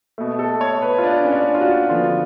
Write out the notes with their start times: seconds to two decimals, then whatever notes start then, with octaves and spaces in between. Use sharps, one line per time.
0.18 B2 A3
0.39 A4
0.61 C#5
0.82 B4
0.98 F4
1.03 D4
1.25 C#4
1.32 D4
1.55 F4
1.61 F#4
1.90 D3 F3 B3 F4